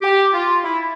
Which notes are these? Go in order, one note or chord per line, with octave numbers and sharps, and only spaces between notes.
G4
F4
E4